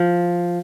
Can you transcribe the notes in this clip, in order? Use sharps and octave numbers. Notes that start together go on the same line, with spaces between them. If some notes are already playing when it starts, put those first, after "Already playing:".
Already playing: F3